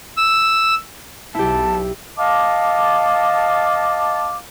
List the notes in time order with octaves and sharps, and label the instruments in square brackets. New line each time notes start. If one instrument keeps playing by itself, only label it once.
[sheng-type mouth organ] E6
[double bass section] B1 [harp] E4 G4 [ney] A5
[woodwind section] D#5 F5 A5 D6